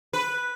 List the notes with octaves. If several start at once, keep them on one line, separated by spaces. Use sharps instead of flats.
B4